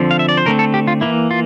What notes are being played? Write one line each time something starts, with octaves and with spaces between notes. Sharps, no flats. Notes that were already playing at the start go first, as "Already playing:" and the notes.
Already playing: D3 F3 C4
F5
E5
D5
C5
D3 A3 C4 A#4
A4
G4
F4
E3 A#3 E4
F4